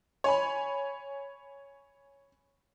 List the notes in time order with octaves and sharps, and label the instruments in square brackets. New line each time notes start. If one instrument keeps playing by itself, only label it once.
[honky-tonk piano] C#5 G#5 B5